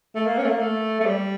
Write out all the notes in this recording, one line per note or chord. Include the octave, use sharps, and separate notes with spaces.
A3
A#3
C#4
A3
A#3
A3
A3
G3